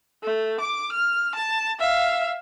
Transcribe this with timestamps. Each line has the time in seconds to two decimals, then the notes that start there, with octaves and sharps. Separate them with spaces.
0.23 A3
0.61 D6
0.92 F6
1.35 A5
1.79 E5 F5